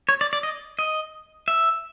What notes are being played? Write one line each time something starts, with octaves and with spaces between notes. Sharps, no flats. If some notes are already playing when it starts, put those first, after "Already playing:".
C#5
D5
D5
D#5
D#5
E5